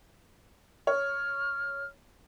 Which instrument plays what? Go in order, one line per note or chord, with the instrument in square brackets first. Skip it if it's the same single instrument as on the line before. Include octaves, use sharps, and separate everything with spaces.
[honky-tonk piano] C#5 [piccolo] F6